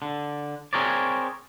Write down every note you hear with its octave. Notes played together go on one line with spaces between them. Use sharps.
D3
C4 G#4 A#4 C#5 D5